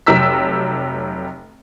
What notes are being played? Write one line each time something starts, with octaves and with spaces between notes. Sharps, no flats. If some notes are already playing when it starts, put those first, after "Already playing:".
F1 F#3 G4 A#5 E6 B6